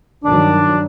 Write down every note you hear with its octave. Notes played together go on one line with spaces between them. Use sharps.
G2 D#3 F#3 D4